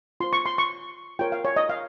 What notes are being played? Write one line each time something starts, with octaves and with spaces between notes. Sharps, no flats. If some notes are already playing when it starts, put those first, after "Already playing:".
F4 C5 C6
C#6
C6
C#6
F4 A#4 C#5 G5
F5
C#5
D#5
F5